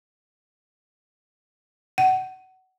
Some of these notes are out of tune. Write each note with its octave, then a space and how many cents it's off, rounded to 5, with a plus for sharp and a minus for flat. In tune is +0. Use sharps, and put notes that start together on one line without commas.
F#5 +20